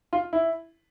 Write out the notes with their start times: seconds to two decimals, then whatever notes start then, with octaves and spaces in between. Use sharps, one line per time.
0.13 F4
0.33 E4